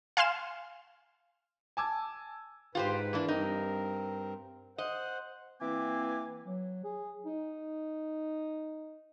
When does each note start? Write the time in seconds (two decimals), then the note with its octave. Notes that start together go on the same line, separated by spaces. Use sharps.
0.17 F5 G#5 C6 F6 E7
1.77 G#5 A5 D6 E6 G#6
2.75 G#2 F4 G4 B4 C5
3.13 E3 A#3 D4
3.28 G2 C4 D#4 A#4
4.78 C5 D#5 F#5
5.61 E3 A#3 C4 G#5 D6
6.46 F#3
6.84 G#4
7.26 D#4